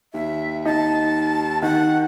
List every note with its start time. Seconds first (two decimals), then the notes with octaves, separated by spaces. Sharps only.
0.14 D#2 E5
0.65 D#4 A5
1.62 D#3 F#5